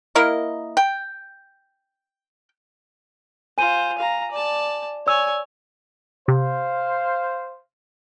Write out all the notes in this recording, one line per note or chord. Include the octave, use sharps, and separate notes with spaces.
A#3 E4 A#4 D#5
G5
F4 C5 G#5 D#7
F5 A#5
D5 A5
C#5 D5 G#5 E6
C3 C5 F5